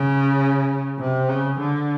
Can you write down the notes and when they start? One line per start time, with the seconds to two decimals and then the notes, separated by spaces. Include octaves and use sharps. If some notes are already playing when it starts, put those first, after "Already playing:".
Already playing: C#3
0.98 C3
1.29 C#3
1.60 D3